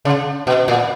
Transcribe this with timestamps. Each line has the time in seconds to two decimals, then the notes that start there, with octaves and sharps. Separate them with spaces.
0.05 C#3
0.47 B2
0.68 A#2